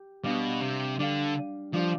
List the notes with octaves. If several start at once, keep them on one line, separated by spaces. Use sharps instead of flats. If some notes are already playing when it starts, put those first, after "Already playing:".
Already playing: G4
B2 G3 D4 G4 D5 F5
C3
D3 G3 D4 G4 D5 F5
F3 G3 D4 G4 D5 F5